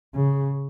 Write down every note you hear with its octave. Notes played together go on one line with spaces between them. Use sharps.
C#3